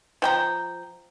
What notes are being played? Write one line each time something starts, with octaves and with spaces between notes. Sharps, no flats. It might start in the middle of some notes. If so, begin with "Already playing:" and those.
F3 G5 A#5